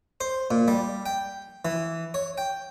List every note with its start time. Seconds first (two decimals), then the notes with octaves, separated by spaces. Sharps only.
0.21 C5
0.51 A#2
0.68 G3
1.06 G5
1.65 E3
2.14 C#5
2.38 G5